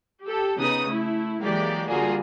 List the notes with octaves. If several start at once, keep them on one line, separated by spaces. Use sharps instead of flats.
G4 A4
C#3 B3 D#4 D#6
A3 E4
E3 F#3 G#3 A#3 G4 D5
D3 G3 A#3 F4 F#4 G#4